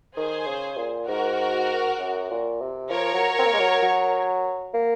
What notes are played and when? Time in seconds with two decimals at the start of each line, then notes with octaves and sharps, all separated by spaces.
0.16 D#3 G#4 C5
0.47 C#3
0.77 A#2
1.08 G#2 F#4 A#4
1.99 F#2
2.30 A#2
2.61 C3
2.91 F3 A#4 C#5
3.14 F#3
3.39 C4
3.45 A#3
3.53 G#3
3.59 F#3
3.82 F#3
4.74 A#3